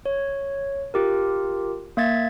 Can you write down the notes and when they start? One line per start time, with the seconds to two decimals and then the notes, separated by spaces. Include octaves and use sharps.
0.06 C#5
0.94 F4 G4 A#4
1.97 A#3 E5 G#6 A6